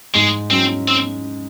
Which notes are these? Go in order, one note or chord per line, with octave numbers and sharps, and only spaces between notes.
G#2 G#3
F#3 C4 C#4
C4